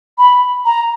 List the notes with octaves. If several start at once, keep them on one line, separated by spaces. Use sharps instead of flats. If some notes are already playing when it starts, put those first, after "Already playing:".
B5
A#5